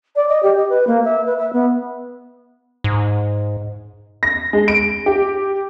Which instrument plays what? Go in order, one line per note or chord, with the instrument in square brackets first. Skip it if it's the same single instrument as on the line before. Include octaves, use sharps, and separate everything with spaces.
[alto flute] D5
D#5
G4
D#5
B4
A#3
E5
B4
E5
B3
[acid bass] G#2
[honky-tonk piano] A#6
G#3
D7
G4